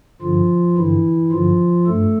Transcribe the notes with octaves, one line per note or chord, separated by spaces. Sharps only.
G2 D3 F3 F4
G2 D3 E3 E4
G2 D3 F3 F4
G2 A3 A4